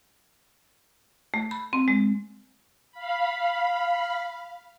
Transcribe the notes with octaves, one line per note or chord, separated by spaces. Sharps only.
A3
B5
C4
G#3
F5 B5